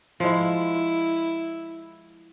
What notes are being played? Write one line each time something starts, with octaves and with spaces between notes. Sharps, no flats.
F3 G#3 E4